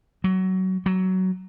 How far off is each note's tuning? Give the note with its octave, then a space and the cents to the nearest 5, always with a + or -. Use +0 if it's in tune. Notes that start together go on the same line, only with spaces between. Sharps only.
F#3 +20
F#3 +15